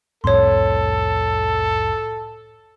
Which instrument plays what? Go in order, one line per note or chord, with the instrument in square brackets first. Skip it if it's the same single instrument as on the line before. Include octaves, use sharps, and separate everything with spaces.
[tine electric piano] C2 F2 A2 [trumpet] A4 [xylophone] C#5 C6